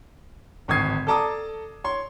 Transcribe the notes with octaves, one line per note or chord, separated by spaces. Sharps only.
D1 G#1 C#6 D#6 G#6 C7
A4 D5 A5 A#5 D6 D#6
C#5 C6